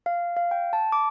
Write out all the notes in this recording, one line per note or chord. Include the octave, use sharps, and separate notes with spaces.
F5
F5
G5
A5
D6